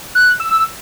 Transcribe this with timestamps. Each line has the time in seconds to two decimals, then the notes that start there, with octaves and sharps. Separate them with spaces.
0.15 F#6
0.40 E6